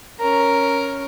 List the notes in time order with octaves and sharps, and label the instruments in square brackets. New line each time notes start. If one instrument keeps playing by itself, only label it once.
[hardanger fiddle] C#4 A#4